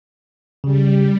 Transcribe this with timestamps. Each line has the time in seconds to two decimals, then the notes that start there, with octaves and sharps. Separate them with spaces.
0.64 C#3 G3